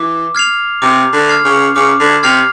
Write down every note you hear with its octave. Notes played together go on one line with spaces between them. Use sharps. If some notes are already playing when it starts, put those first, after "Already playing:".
Already playing: E3 D6
F6 G#6 C7 F7
C3 D6
D3
F6 G#6 C7 F7
C#3
C#3 D6
D3
C3 F6 G#6 C7 F7